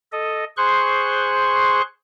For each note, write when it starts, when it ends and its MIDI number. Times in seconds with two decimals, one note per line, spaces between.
0.12 0.44 69
0.12 0.44 75
0.57 1.81 68
0.57 1.81 72
0.57 1.81 84
0.57 1.81 85
0.57 1.81 90